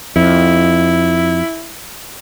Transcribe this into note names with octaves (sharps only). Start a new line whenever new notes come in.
F2 E4